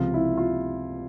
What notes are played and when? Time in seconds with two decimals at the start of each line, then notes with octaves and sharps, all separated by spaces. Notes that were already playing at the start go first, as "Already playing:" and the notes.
Already playing: C#2 C3 F3 F4
0.14 E4
0.37 F4